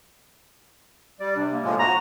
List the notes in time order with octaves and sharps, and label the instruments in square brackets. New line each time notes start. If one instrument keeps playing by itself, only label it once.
[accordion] G3 [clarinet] D5
[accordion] C3 [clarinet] D4
[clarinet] A#3
[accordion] A2 F3 G#3
[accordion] F#4 [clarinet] A#5